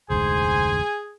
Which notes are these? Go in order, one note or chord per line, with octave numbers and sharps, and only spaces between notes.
F1 D2 G#2 G#4 C5 G#5